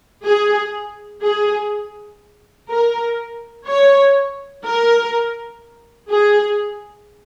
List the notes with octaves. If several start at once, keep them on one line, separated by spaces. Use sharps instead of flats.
G#4
G#4
A#4
C#5
A#4
G#4